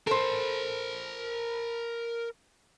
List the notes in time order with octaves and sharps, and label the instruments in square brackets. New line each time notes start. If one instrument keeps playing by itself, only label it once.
[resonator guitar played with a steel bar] A4 C5 [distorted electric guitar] A#4 B5